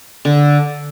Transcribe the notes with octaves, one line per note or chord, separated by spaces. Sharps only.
D3